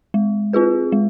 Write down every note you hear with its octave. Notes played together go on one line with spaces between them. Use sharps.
G#3
C4 F4 G#4 B4
G#3